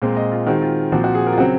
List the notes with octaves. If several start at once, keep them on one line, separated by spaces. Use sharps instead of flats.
A#2 G#3 C4
D#5
F4
D#3 G#3 C4 F#4
F4
A#2 F3 C4 F#4
F#4
G#4
A#4
F4
C#3 F#3 C4 F#4